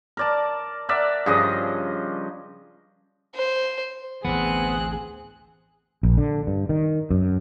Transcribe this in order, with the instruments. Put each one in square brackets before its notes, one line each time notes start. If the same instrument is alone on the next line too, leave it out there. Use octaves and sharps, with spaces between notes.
[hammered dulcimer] A#4 D5 A5
A#4 D5 E5 F#5
G2 C#3 F3 D#5
[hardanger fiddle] C5
[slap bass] A1 D2 E3 [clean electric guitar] B3 [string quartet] C4 F#6 [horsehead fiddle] G#4
[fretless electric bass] A#1
D3
G2
D#3
F#2